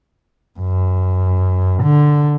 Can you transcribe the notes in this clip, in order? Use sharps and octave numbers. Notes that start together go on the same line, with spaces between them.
F#2
D3